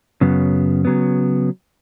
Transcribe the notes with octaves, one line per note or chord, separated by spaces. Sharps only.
F#2 C#3 F#3 B3
C#3 F#3 B3